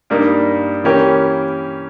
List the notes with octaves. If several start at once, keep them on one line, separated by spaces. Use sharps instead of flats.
G2 G3 A#3 D#4
E3 A#3 C#4 G4 A#4